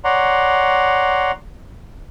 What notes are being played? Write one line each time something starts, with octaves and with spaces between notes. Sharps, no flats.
C#5 D5 F#5 A#5 C6